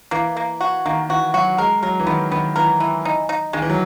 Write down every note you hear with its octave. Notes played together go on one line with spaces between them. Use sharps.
E3 A#3
A#3
F#4
D#3 A#3
E3 F#4
F#3 F#4
G#3 A#4
F#3 A#4
E3
D#3 B3
D#3 B3
E3 A#4
E3
D#4
D#4
D#3 G#3
E3
F#3